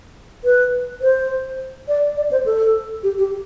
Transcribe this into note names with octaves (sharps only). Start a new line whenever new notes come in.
B4
C5
D5
D5
C5
A4
G4
G4